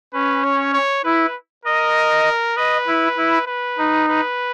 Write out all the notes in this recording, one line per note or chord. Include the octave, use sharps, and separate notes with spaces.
C#4 B4
C#5
C#5
E4 B4
A#4 D#5
B4 D#5
E4
E4
B4
D#4
B4